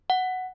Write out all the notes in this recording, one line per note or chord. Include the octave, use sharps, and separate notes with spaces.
F#5